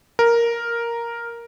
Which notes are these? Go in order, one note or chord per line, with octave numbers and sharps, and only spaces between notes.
A#4